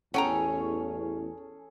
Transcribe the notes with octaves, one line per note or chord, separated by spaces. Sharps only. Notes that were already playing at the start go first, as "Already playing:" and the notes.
A1 E2 C#4 G#4 A4 F#5 G5 A#5